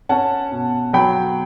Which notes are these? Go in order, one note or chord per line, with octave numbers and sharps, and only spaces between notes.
C#4 F#5 A5
B2
F#3 G5 B5